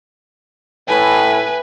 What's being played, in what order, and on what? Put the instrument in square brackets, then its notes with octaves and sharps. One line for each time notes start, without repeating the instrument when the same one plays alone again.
[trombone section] A2 [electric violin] B4 G#5